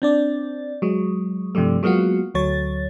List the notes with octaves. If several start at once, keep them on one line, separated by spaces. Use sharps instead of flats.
C4 D4 D5
F#3 G#3
G2 C3 F3 G3 A3
F#3 G#3 A#3 B3 F4 F#4
D2 F#3 C#5 A6